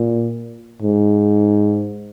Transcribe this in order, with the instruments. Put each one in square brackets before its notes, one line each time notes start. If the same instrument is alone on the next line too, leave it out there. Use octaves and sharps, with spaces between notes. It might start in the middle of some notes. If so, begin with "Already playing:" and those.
Already playing: [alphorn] A#2
G#2